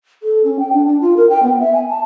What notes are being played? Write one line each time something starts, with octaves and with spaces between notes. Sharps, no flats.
A4
C#4
G5
D4
D4
F4
A#4
G5
B3
E5
G#5
A5